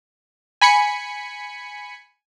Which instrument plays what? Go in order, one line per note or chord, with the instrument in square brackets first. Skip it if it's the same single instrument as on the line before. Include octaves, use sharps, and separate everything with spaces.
[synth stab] G#5 B5 B6 C#7